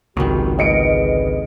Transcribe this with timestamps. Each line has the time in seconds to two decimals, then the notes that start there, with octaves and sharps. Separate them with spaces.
0.17 G#1 C#2 C3 D#3 F#3 F#4
0.59 G#2 D3 G#3 B4 D#5 C#7 D7